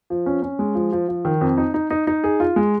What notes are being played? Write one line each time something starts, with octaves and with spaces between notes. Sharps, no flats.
F3
C#4
C#4
G#3
F3
F3
F3
D#3
F2
D#4
D#4
D#4
D#4
G#4
F4
G#3